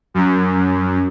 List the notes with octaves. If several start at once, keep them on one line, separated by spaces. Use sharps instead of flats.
F#2